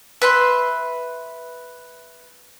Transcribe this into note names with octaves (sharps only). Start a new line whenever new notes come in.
B4 E5 C6